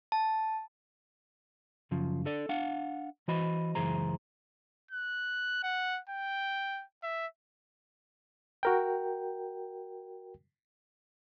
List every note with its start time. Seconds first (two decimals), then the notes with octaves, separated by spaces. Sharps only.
0.12 A5
1.91 F#2 C#3 F3
2.25 D4 A4 D5
2.49 D4 F5 F#5
3.28 E3 F#4 C5 D#5 B5
3.75 C#2 F#2 E3 G#4 C5 A#5
4.91 F#6
5.63 F#5
6.09 G5
7.03 E5
8.63 F#4 A#4 G5